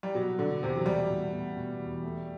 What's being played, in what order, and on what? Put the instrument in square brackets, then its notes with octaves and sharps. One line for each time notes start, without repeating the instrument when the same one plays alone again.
[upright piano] G3
[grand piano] B2 [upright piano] F#3
[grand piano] B2 [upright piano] D3
[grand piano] E2 [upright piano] C3
[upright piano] F#3
[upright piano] G3 [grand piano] A3
[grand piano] B2
B2
B2
E2
A3